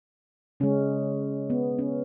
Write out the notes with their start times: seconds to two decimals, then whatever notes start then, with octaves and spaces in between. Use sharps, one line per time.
0.60 C#3 G#3 C#4
1.50 B3
1.79 C#4